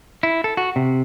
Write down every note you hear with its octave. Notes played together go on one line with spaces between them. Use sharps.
E4
A4
F#4
C3